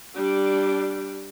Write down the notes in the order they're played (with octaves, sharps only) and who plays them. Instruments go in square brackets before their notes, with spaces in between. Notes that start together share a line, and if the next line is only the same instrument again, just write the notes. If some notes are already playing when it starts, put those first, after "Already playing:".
[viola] G3 D4